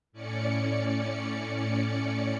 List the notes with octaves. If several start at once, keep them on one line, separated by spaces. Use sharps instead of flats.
A2 C#4 D5 C#7